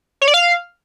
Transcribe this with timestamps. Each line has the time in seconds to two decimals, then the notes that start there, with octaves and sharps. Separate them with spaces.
0.22 C#5
0.28 D5
0.34 F5